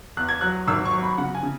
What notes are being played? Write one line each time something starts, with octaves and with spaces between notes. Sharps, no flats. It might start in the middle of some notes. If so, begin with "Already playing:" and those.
E2 F#6
G#6
F#3 F#6
G#1 E6
C#6
F#3
B5
C#3 F#5
G#5
C#3